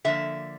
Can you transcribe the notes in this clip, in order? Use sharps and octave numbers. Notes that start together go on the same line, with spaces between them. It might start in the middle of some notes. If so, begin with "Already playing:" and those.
D3 F3 A#3 E5